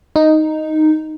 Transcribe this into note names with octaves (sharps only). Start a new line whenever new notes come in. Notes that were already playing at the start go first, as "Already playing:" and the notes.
D#4